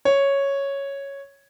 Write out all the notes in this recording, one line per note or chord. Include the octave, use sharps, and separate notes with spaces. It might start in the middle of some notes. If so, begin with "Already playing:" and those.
C#5